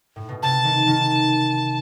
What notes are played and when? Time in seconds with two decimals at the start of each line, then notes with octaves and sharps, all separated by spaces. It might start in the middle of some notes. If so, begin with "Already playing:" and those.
0.16 A2
0.29 B2
0.42 C3 A5
0.64 D#3
0.87 D#3